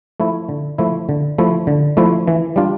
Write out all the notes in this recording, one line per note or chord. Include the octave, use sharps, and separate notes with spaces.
F3 A3 E4
D3
F3 A3 E4
D3
F3 A3 E4
D3
F3 A3 E4
E3
G3 D4 F4